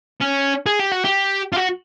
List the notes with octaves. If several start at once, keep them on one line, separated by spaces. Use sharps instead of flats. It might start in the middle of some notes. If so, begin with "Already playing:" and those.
C#4
G#4
G4
F#4
G4
F4
F#4